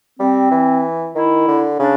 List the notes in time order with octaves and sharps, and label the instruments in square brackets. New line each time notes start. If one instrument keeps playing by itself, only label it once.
[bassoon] G3 [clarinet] C4
[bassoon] E3
[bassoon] D#3 [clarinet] E4
[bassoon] D3
[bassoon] C#3 [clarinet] D4